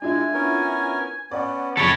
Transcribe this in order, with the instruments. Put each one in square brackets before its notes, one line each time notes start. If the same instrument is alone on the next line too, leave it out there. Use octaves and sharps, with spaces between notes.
[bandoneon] G#3 [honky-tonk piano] D4 E4 F4 [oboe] G#5
[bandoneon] B3 C#4 A#4
[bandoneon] B3 C#4 [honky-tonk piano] D5 F#5
[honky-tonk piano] F#1 F2 G#4 [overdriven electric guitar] A4 C#5 [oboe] B5